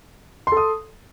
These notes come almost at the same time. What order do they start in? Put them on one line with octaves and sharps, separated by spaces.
C6 A4 D#6